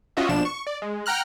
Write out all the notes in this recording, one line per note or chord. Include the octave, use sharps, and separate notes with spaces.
C#4 F4 F#4 D#5 E5
A#1 B2 F3 D4 E7
C#6
D5
G#3
F#5 G5 A#5 F6 F#6